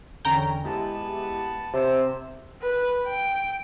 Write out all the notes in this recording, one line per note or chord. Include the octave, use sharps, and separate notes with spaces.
E2 D3 C#4 G5 A#5
G#3 B3 E4 G4 A5
C3 C4 C5 E6
B4
G5